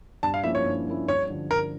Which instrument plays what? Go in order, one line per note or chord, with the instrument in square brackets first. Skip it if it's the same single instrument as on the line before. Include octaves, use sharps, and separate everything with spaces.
[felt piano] G2 [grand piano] A5
[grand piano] F5
[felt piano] F3 A#3 C#4 E4 [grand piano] E5
[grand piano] C#5
[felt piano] G2
F3 A#3 C#4 E4
[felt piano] G2 [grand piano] C#5
[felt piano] D3 F3
[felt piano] G2 [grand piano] A#4